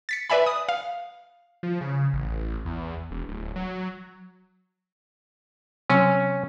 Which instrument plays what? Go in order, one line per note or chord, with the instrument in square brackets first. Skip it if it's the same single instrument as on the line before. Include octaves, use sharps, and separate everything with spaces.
[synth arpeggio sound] A6 B6 C#7
B4 D5 E5 G#5 B5
D#6
F5
[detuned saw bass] F3
C#3
A1
E2
E1
D1
F#3
[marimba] C3 F#3 C4 [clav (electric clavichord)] C#4